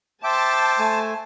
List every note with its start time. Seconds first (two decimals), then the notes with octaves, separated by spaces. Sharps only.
0.24 C5 E5 G5 A5 D6
0.79 A3 G#5